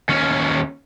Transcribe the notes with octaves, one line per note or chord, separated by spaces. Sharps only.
D#2 C#4